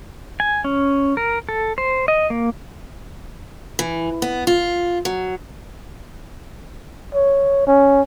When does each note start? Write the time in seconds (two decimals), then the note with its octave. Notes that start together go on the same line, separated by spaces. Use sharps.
0.40 G#5
0.64 C#4
1.17 A#4
1.49 A4
1.78 C5
2.08 D#5
2.30 A#3
3.79 E3
4.22 B3
4.47 F4
5.05 F#3
7.14 C#5
7.67 C#4